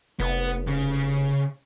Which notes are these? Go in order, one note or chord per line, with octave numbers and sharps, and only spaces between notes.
F1 B3
C#3